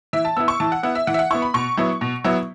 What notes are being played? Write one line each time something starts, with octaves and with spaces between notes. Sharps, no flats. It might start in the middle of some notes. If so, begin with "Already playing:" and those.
E3 E5
A5
B3 E4 E6
C#6
E3 A5
F#5
B3 E4 F#5
E5
E3 F#5
E5
F#5
B3 E4 C#6
B5
B2 C#6
F#3 B3 E4
B2
F#3 B3 E4